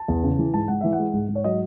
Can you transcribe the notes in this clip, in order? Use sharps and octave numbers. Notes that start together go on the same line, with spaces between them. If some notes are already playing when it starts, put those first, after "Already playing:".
Already playing: A5
E2
C#3
E3
G#2 A5
G#2 F#5
E3 E5
F#5
G#3
G#2
G#2
C#5
F#3 D#5